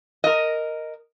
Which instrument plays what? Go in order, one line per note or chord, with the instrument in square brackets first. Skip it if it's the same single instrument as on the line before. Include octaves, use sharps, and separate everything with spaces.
[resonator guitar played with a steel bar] A#4 D#5